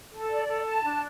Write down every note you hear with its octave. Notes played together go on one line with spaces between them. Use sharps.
A4
D5
A4
A5
D4